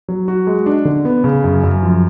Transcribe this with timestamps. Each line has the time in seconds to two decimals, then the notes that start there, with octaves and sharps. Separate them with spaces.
0.08 F#3
0.28 F#4
0.47 G#3
0.66 D4
0.85 D3
1.05 B3
1.24 C#3
1.44 F#2
1.63 F#2
1.83 F3